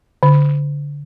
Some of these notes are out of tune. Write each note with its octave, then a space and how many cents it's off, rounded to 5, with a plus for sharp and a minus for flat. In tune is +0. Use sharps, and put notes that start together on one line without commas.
D3 -25